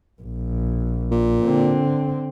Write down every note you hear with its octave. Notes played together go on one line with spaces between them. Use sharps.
A#1
A#2
D3 C4